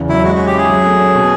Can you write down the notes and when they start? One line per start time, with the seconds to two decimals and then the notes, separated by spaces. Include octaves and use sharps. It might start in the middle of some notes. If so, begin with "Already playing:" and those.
Already playing: E2 C#3
0.09 F#3 E4
0.24 G#3 F#4
0.35 C#4 F#4
0.47 G4
0.54 E4 G#4
0.69 F#3
0.86 A3
1.00 C#4
1.15 B2